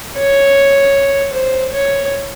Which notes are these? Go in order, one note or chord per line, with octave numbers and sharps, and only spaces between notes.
C#5
C5
C#5